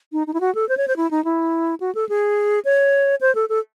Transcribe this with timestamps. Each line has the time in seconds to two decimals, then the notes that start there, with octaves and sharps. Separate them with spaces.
0.12 D#4
0.27 D#4
0.34 E4
0.40 F#4
0.55 A4
0.69 C5
0.77 C#5
0.88 C5
0.97 E4
1.11 D#4
1.24 E4
1.80 F#4
1.95 A4
2.09 G#4
2.65 C#5
3.21 C5
3.35 A4
3.49 A4